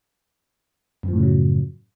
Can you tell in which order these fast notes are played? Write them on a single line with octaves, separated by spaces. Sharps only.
F#2 F3 A2 C#3 F#3